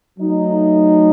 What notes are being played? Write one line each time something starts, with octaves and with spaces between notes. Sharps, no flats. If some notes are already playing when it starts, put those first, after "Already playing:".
F#3 A3 D#4